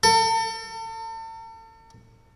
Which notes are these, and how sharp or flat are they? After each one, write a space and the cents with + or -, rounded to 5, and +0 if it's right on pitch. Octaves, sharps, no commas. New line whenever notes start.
A4 +40